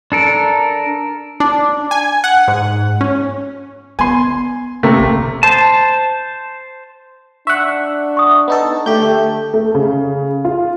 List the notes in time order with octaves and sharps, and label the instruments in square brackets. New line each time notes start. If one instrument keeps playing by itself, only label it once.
[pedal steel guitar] D4 A4 A#4
[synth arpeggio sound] D4
G#5
F#5
G#2
C#4
[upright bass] B3 [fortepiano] G#5 C6
[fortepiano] C3 A3 A#3
[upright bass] A#1
[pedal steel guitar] C5 A5
[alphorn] D4 [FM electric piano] E5 F#5 [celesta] C#6 F#6
[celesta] C#6 D#6
[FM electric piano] B3 D#4 A4
[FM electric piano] D3 G4 G6 [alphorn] A3
[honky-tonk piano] A3
C#3
F4